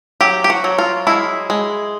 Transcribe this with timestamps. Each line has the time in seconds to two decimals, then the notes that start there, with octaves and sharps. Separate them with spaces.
0.21 F#3 G4
0.44 G4
0.50 F#4
0.64 F#3
0.78 F4
1.07 G#3 E4
1.50 G#3